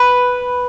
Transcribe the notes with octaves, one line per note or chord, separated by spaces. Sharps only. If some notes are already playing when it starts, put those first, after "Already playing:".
Already playing: B4